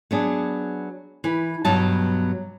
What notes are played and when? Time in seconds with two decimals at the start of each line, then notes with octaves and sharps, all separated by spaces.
0.11 F#3 B3 D4 G#4
1.24 E3 B4
1.65 G2 B2 F#3 A5